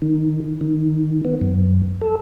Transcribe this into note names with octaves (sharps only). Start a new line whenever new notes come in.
D#3
D#3
B3
F#2
A4